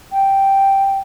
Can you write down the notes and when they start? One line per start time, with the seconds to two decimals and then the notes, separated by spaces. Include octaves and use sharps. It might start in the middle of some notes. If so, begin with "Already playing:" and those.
0.12 G5